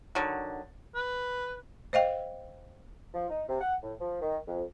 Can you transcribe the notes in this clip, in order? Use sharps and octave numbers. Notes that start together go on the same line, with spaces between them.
D3 D#3 F#3
B4
C5 D#5 F5 G5
F3
D#4
C3
F#5
A2
F3
D#3
F2